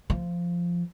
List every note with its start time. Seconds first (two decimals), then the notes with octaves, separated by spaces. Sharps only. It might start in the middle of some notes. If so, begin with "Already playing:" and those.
0.10 F3